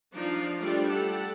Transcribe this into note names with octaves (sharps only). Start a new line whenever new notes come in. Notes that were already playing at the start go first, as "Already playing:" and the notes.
F3 D4 D#4 D5 F5
G3 A3 D4 F4 G4 D5
G4 A4 F#5 A5